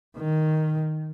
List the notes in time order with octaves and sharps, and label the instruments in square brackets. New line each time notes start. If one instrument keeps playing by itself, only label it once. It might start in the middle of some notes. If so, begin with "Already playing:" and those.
[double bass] D#3